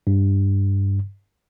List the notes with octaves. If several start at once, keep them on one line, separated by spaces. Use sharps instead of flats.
G2